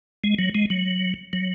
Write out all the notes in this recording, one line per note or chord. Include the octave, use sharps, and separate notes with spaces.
G#3
F#3
G#3
F#3
F#3